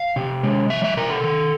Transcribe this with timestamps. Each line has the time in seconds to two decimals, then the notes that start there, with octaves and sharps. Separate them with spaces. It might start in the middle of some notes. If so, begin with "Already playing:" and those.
Already playing: F5
0.16 C3
0.43 G#3
0.70 F3 E5
0.84 E5
0.97 C3 A#4
1.10 A4
1.24 D#3